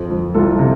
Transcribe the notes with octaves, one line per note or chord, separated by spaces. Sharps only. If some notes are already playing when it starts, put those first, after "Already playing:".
Already playing: F2 F3
F3
C2 F4 A4
C3